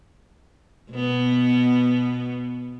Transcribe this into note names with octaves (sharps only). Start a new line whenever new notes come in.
B2 B3